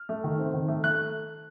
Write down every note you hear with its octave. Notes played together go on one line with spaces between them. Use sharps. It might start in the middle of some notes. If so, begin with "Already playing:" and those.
Already playing: F6
A3
D#3
C4
D#3
A3
A3 F#6